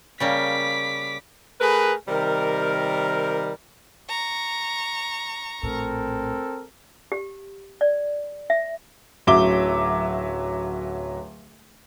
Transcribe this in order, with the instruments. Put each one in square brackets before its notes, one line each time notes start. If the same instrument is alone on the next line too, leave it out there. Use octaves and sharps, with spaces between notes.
[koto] C#3 G3 A#3 [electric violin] D6 B6
[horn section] A3 G#4 A#4 B4
C3 D#3 G3 A#4
[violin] A#5 C#6
[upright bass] A#1 A2 [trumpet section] C4 A4 A#4
[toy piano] G4
D5
E5
[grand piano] D1 F#3 C#4 E5 D6 G7